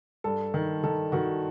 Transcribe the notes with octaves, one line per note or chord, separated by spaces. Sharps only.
G2 A4
D#3
D#3 A4
D#3 F#4